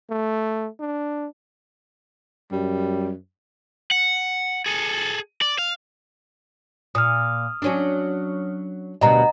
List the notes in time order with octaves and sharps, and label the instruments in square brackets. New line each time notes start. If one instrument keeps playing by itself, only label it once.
[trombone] A3
D4
[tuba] F#2 [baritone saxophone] G3
[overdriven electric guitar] F#5
G#4 A4
D5
F5
[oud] A#2 [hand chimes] D#6 F6
[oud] F#3 C#4 D4
[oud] D2 B2 G3 [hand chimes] D#5 F#5 A#5